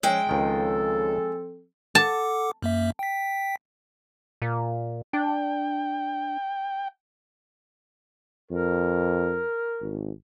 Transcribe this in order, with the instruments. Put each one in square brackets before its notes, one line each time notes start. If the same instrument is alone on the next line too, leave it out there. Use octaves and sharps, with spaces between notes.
[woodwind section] F3 C#4 C#5 [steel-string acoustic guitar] G#3 G5 [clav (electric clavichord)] E5
[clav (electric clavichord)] C#2 D#3 [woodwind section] F3 C4 A4
[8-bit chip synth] A4 F#5 D6 [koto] A5
[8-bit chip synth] F#2 A#3 E5
G5 B6
[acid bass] A#2
[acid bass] D4 [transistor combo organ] G5
[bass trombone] F2 [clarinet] A#4
[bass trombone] G#1